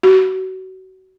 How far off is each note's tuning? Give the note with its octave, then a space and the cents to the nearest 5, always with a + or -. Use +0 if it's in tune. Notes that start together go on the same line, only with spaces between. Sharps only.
F#4 +30